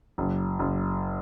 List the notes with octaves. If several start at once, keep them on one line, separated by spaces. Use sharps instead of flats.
F#1
F#1